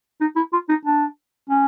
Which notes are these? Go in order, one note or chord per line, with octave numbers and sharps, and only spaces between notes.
D#4
E4
F4
D#4
D4
C#4